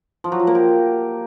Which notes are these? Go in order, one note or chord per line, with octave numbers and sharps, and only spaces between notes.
F3
F#3
F3
A#3
G4